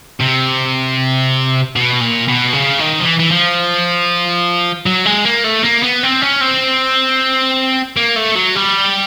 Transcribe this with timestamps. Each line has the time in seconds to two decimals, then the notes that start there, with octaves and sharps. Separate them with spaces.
0.21 C3
1.76 B2
2.01 A#2
2.28 B2
2.53 C#3
2.79 D#3
3.00 F3
3.05 E3
3.19 E3
3.31 F3
4.86 F#3
5.06 G#3
5.25 A#3
5.44 A3
5.63 A#3
5.83 B3
6.03 C4
6.21 C#4
6.41 C4
7.97 A#3
8.16 A3
8.35 F#3
8.55 G3